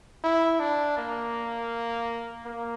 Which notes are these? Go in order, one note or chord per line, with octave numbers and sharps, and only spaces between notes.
E4
D4
A#3
A#3